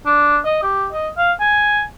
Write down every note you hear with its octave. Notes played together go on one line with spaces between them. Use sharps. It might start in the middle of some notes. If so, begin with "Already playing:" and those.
D4
D#5
G4
D#5
F5
G#5